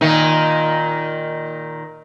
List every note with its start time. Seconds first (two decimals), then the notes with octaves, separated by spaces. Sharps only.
0.01 A#2 D#3 D#4